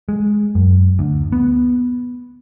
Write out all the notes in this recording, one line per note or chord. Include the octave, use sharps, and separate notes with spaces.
G#3
F#2
D2
B3